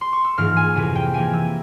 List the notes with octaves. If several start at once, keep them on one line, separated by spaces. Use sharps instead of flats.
C6
C#6
E6
G#2 E3 A#3 F4 F6
G#5
F2 C3 E3 A#3 E4 G#5
G5
E3 A#3 E4 G#5
E6